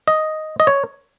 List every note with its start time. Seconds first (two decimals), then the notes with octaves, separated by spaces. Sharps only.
0.08 D#5
0.60 D#5
0.67 C#5